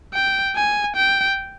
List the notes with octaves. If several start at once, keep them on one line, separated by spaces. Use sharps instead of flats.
G5
G#5
G5